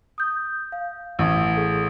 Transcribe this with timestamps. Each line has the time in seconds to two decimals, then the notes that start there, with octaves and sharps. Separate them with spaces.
0.18 D#6 G6
0.72 F5
1.19 A1
1.57 G#4 A4